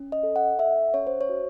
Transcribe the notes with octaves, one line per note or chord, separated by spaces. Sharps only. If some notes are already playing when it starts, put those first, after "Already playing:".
Already playing: C#4
D#5
A4
F#5
A4 E5
C#4 C#5
C5
C#5
F#4